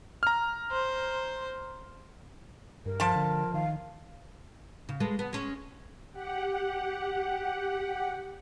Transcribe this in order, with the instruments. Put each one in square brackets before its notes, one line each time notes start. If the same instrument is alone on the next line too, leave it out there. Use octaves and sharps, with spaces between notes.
[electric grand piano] A#5 F6
[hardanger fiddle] C5
[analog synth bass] G2 [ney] A#4
[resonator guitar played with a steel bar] F3 A5
[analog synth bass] D3
[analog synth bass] D#3 [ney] F5
[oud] C#3
G#3 A4 B4
B3
G#3 C#4
[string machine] G4 F#5